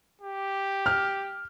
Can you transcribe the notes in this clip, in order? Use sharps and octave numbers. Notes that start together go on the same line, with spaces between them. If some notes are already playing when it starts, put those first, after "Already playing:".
G4
F6